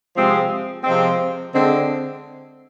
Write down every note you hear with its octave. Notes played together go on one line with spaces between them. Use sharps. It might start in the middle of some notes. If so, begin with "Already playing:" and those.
C3 F3 G#3 C4
C3 F3 G#3 C4
D3 G#3 C4